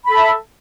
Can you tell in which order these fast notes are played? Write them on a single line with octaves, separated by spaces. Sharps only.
B5 A4 A5 E5